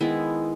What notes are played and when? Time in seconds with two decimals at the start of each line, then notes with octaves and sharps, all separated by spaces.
0.01 D#3 G#3 B3 E4